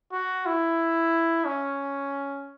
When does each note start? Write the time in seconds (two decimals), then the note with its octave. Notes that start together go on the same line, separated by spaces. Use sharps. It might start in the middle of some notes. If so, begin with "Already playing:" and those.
0.12 F#4
0.46 E4
1.45 C#4